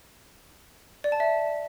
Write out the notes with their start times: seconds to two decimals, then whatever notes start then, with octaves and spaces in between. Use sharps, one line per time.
1.04 D5
1.12 A5
1.20 E5